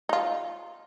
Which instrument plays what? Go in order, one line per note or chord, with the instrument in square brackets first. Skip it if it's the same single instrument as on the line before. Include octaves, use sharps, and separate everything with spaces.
[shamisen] D#4 F4